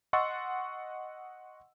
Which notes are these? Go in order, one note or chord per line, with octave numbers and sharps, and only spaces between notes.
D#5 F#5 C6 C#6 E6 A6